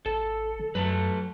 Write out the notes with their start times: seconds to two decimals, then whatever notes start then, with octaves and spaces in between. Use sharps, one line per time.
0.06 G#1 A4
0.59 D3
0.75 F#2 F#3 A3 A4 B4